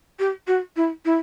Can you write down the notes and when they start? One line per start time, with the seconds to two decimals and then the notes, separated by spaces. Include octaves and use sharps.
0.19 G4
0.47 F#4
0.77 E4
1.05 E4